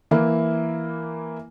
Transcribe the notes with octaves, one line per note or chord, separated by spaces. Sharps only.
E3 A#3 E4